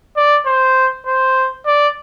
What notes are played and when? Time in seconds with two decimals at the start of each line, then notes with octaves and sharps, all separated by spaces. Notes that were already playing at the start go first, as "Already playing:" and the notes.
0.17 D5
0.46 C5
1.06 C5
1.66 D5